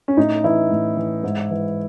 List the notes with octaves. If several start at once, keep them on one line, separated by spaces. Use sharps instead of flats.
C#4
A2 D#4
E3 E4
A2
E3
G#2
E3